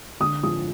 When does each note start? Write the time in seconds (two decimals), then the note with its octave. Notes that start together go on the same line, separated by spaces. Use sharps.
0.20 D3 D#6
0.43 F3 D#6